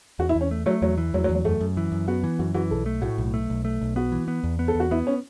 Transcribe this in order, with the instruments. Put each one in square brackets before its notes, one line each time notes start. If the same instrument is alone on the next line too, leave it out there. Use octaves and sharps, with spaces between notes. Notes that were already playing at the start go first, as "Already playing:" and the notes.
[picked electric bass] E2 [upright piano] F#4
[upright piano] E4
[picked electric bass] E2
[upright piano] C#4
[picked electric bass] A3
[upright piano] F#3 [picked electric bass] A3
[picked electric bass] E2 [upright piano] F#3
[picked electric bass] E3
[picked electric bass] E2 [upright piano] F#3
[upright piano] F#3
[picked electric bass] E2
[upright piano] F#3
[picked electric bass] F#2 [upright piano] A3
[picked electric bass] F#2
E3
F#2
[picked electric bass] B3 [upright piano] F#4
[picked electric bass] E3
[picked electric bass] F#2 [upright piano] F#4
[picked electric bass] E3 [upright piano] F#4
[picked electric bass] B1 [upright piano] A4
[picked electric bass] A3
[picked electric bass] A2 [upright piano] F#4
[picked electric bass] B1
A3
B1
A3
B1
[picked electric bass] B3 [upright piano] F#4
[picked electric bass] E3
B3
E2
B3
[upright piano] A4
[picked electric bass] E2
[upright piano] F#4
[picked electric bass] B3 [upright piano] E4
[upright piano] C#4